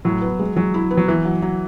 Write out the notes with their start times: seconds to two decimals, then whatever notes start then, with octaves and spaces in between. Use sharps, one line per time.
0.05 A2 F#3
0.22 B3
0.39 G#3
0.56 F#3 G#3
0.74 E4
0.90 B3
0.97 F#3
1.08 E3 B3
1.25 F#3
1.42 F#3